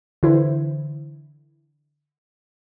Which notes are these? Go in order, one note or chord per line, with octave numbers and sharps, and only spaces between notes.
D3 E3 E4 C5